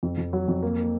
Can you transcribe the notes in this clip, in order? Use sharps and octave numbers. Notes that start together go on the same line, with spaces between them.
F2
F2
F#3
F2
A#3
A#3